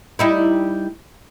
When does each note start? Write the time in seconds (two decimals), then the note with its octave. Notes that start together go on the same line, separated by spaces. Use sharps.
0.19 G3 D#4 E4